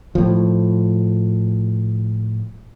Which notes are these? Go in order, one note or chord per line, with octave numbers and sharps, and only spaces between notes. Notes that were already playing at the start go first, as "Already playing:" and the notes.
A2 F3